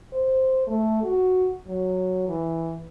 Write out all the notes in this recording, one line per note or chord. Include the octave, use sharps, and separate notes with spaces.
C5
A3
F#4
F#3
E3